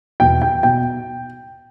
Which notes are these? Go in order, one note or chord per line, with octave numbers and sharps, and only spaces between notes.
E2 B2 G5
G5
B2 G5